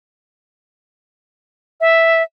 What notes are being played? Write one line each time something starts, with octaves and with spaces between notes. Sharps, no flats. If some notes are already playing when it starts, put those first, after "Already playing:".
E5